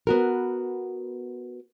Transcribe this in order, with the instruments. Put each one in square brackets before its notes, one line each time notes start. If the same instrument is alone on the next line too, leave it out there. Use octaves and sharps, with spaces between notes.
[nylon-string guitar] B3 F#4 A#4